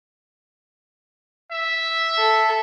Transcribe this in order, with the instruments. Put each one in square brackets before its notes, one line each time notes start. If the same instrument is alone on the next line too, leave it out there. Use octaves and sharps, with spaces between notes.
[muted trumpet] E5
[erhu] A4